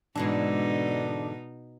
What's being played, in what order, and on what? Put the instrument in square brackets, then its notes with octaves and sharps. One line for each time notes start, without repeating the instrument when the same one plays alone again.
[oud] G#2 D3 E3 [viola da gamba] B2 D#4 [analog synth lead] D4